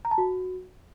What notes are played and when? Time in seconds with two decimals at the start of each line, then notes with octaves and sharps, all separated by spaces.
0.05 A#5
0.11 A5
0.18 F#4